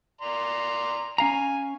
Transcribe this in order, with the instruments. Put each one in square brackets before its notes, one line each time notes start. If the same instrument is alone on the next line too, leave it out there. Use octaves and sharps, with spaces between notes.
[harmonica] D5 A#5 C6
[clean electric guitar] C#4 F5 A#5 [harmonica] G#5